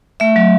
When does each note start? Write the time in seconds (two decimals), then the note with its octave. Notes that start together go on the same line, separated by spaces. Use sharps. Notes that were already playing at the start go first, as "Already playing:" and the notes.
0.20 A3 E5
0.36 F#3